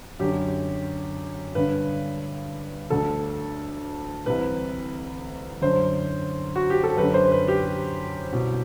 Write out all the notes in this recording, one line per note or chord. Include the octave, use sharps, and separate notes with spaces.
F#2 D3 G4
G2 D3 B4
D2 D3 A4
C2 C3 E3 B4
F#2 D3 C5
F#4
G4
A4
F#2 D3 B4
C5
B4
G4
C2 B2